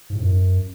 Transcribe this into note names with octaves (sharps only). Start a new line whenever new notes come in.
G#2
A2
F#2